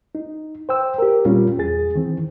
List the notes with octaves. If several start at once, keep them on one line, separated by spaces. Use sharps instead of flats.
D#4
C5 G5 E6
G4 A#4
A#2 G3 C4 C#4 F4
E2 G#4 A6
D#3 E3 C4